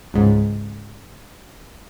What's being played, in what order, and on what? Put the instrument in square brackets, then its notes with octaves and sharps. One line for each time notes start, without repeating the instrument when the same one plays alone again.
[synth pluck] C#2 G#2